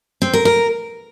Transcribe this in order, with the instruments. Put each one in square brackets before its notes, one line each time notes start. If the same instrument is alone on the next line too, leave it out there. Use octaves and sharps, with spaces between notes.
[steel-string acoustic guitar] C4
A#4
A#4